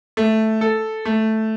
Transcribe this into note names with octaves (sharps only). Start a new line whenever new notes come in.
A3
A4
A3